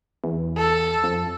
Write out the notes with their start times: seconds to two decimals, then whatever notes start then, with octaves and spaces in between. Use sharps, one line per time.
0.24 E2
0.57 A4
1.04 F2